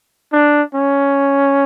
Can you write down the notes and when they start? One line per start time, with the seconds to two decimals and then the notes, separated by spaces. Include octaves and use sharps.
0.33 D4
0.75 C#4